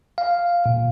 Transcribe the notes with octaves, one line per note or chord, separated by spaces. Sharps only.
F5
A#2